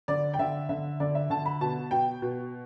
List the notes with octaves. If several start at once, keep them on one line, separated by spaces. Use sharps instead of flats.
D3 D5
G5
D3 E5
D3 E5
D3 D5
E5
D3 A5
B5
B2 A5
B2 G5
B2